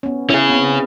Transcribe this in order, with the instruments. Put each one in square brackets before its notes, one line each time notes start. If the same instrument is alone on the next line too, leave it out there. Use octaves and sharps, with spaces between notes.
[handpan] B3 C#4
[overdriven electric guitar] C#4 G#4 [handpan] E4
[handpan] B3 C4